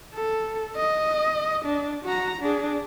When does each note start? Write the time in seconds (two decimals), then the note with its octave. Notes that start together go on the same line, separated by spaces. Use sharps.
0.14 A4
0.77 D#5
1.65 D4
2.05 F#4 A#5
2.41 D4 G#4